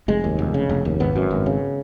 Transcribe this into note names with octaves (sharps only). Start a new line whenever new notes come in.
F1 G#3
D#2
F1
C#3
F1
D#2
G#1 B3
F#2
G#1
C#3